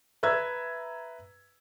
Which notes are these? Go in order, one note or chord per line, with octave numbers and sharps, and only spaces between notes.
B4 E5 A#5 E6 G#6